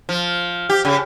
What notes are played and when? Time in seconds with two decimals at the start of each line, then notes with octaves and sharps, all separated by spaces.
0.09 F3
0.69 G4
0.85 C#3